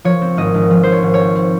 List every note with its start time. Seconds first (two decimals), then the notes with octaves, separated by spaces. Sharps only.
0.05 F3 C#5
0.21 C4
0.37 G#1 D#5
0.54 G#1
0.70 F3
0.83 F3 C5
0.92 C#5
1.02 G#1
1.14 C#5
1.19 C4
1.35 C4